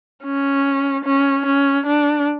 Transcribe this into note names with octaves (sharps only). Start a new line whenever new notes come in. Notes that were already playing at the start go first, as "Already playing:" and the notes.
C#4
C#4
C#4
D4